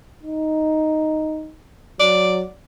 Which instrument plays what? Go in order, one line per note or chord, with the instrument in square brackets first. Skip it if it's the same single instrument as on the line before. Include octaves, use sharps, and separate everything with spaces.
[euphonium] D#4
[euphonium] F#3 [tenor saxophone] D5